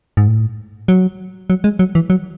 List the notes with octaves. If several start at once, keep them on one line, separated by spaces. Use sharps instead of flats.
G#2
A2
F#3
F#3
G#3
F#3
E3
F#3